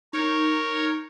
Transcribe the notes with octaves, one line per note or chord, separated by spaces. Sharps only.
D#4 A#4 C#5